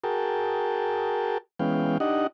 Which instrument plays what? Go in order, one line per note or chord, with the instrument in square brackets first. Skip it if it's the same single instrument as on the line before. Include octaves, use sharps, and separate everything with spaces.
[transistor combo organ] F#4 G#4 A#4 G5 A5
E3 G#3 B3 C#4 F5 G5
D4 D#4 G4 D#5 F#5